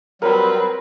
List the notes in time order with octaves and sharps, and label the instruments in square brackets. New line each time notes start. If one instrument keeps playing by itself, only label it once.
[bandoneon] F#3 G3 [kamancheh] C4 B4 [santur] A#4